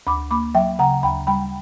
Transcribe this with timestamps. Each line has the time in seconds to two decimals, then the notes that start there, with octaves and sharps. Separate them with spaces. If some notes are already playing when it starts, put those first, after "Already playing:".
0.07 D2 B5 D6
0.31 A#3 B5 D6
0.55 F#3 E5 G5
0.79 C#3 F#5 A#5
1.03 D2 G5 B5
1.27 G3 G5 B5